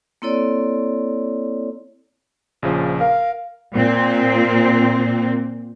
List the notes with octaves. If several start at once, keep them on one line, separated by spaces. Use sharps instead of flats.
A#3 C4 E4 A4 C#5 D5
A#1 C#3 F3
A#4 F5
A#2 C4